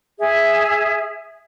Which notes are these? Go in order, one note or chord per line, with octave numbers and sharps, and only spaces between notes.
G#4 E5